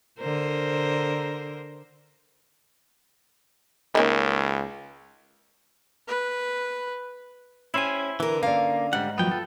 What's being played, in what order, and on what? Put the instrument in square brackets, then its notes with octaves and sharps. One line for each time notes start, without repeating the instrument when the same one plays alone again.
[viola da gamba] D3 A#4 C5
[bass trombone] C#2 [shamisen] D#3 A#3 C#4
[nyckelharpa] B4
[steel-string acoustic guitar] C#4 G4 [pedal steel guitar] E4 C5 G#5
[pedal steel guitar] D3 [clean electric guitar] E3 [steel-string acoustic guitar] B3 A#4
[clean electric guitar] A#3 [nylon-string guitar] C#4 D5 [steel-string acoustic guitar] F5
[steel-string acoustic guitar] G#2 [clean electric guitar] G3 F#5
[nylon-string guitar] D#2 F3 F#3 [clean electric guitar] B3 G5
[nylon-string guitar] F4 [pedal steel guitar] A4